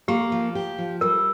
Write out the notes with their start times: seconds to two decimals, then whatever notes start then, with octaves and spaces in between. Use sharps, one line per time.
0.08 A#3 G4
0.32 F3
0.55 G4
0.78 F3
1.01 G3 A#4